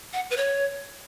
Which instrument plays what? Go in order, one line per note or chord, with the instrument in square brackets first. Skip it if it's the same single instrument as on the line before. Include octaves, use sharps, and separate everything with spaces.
[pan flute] F#5
B4
C#5